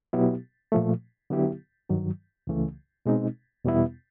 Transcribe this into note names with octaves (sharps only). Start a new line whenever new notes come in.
B2 F#3 B3 E4 G4
A#2 F3 A3
D3 F#3 B3 E4 G4
G2 D#3 F#3
C#2 C#3 E3 A3
B2 G#3 C4 D#4
E2 B2 G3 B3 E4